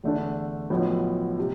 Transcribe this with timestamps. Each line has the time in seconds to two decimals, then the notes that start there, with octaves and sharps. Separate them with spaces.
0.04 E2 D3 A3 D4
0.70 B1 A2 F3 B3
1.39 C3